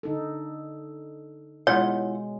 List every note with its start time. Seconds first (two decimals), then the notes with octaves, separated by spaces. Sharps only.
0.03 D3 D#4 A4
1.67 B2 G#3 E4 F4 C#5 F#5